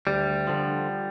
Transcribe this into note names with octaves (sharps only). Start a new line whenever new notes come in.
D2 G3
D3 F3